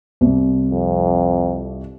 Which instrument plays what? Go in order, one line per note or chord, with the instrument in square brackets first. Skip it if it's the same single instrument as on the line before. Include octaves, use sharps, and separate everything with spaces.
[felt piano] C2
[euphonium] F2